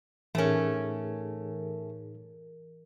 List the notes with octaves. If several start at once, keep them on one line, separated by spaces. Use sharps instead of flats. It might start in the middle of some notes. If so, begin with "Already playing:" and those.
A2 E3 A3 C#4 D#4 G#4 A#4